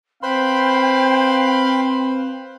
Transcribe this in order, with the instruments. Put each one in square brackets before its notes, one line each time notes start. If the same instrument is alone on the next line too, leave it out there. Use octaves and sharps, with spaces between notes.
[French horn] C4 [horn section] B4 C5 F5 [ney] G5 [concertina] B5 C6